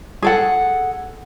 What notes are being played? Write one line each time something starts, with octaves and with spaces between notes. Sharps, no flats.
G#4 A4 F#5